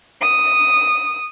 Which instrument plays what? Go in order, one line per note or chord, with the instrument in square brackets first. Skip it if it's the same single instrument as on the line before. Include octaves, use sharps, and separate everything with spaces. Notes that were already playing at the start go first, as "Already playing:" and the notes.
[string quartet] D#6